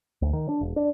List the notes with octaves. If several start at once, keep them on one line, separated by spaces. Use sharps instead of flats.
D2
D#3
D4
E1
D4